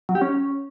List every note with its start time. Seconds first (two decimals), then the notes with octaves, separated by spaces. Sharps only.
0.09 F#3
0.15 G4
0.21 C#4